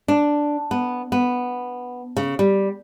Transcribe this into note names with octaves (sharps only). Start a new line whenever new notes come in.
D4
B3
B3
C#3
G3